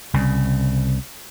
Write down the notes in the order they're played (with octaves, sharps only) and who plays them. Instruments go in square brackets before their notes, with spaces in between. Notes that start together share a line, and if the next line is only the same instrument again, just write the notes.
[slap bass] C2 C#3